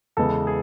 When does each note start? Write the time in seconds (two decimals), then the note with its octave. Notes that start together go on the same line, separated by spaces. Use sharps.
0.17 E2 C#3 G#3 B3 A4
0.47 G#4